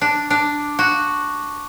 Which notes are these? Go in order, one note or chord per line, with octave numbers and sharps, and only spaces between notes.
D4
D4
F#4